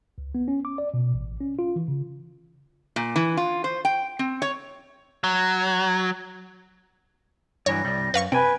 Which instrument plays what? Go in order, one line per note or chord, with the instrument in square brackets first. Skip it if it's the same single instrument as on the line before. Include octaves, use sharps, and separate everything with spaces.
[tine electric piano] C#2
B3
C#4
D6
D5
B2
A1
C#4
F4
E3
C#3
[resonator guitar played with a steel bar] A#2
E3
F4
C5
G5
C4
C#5
[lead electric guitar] F#3
[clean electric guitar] G2 E3 F#3 [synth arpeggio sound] C#5 [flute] A#6
[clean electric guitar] C2 G3
[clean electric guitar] F#2 [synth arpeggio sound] B4 F5 C#6
[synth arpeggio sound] C3 [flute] B4 [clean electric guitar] G5 G#5